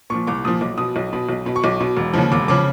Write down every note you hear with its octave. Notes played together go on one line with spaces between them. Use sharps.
A#2 F3 C#6
C2 D6
A#2 F3 D#6
B1 D6
B2 D#6
B1
B2
B1
B2
C#6
B1 D6
B2
E1
D#2 C#3 F3
E1 D6
C#3 F3 D6